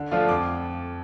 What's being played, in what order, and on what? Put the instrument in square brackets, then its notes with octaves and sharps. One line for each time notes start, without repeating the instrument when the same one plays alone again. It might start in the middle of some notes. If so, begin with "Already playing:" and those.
Already playing: [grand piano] D3
F3 A3 D4 F4
F2 D6